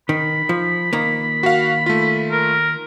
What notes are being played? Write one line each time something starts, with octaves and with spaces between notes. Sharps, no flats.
D#3 B5
F3
D#3 A#3
F#4 F5
A3 F4
A#4